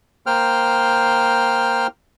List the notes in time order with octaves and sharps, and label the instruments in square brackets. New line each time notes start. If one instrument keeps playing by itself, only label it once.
[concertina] A#3 C5 G5 F6